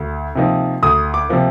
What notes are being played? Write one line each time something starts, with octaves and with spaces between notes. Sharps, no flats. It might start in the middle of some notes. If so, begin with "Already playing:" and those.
Already playing: D2
C3 F3 A#3 D#4
D2 D#6
D6
C3 F3 A#3